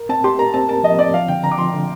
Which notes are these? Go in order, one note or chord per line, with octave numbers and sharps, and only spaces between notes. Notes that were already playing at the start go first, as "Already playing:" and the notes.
Already playing: A#4
C4 A5
G4 C6
A#4 A#5
C4 A5
A#4 A5
F3 D#5
C4 D5
F3 F5
D3 G5
D3 A#5
D6
F3 C6
D3